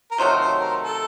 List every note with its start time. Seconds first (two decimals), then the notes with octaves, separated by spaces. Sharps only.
0.11 A#4
0.18 C3 D#3 F#3 A3 C5
0.39 C5
0.60 A#4
0.82 A4